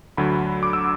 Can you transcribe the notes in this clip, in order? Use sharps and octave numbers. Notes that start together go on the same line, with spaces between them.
D2 D3 F#3 B5
D6
E6